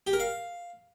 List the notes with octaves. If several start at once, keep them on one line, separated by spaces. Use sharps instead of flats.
G4
A#4
F5